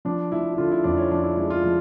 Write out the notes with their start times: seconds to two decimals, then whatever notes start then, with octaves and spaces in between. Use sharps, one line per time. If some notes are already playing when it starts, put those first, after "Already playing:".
0.05 F3 D4
0.32 F3 E4
0.53 E4
0.58 D3 F4
0.71 E4
0.84 F2 D4
0.97 C#4
1.11 F3 D4
1.24 E4
1.37 G#3 E4
1.50 F4
1.64 F3